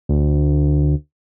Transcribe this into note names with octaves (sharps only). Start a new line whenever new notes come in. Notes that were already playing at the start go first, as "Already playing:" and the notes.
D2